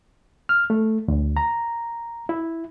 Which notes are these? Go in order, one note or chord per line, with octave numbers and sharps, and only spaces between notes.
F6
A3
D2
A#5
E4